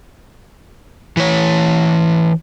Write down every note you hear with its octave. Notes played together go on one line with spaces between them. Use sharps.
E3 C#5